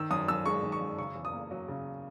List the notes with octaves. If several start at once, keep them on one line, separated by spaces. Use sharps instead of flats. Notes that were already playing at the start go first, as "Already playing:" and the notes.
Already playing: D#3 E6
F#2 D#6
F#2 E6
G#3 C#6
D#3
C#6
F#2
C#3 C#6
E2
D#6
A#3
F#3
C#3